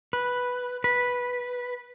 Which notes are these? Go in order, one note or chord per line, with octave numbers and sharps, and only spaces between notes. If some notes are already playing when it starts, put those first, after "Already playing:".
B4
B4